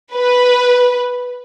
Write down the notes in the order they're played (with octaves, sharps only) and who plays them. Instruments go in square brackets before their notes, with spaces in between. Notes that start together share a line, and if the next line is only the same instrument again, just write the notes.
[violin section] B4